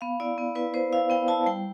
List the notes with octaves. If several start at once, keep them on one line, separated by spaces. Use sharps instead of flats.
B3 F5
E4 D5
B3
E4 B4
B3 C5
E4 F5
B3 G5
E4 A5
G3 G5